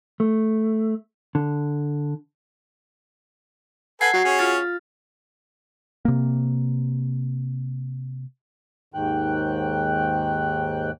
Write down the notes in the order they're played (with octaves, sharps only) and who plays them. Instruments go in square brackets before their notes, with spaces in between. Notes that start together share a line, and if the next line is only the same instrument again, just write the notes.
[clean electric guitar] A3
D3
[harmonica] A4 B4 G#5 [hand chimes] F#5 G#6 C7
[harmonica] F#3 [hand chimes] F#4 F#5
[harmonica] C#4 G#4 C#5
[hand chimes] F4 F6 A6
[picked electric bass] C3 A#3
[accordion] D#2 G#2 D#3 G5 F#6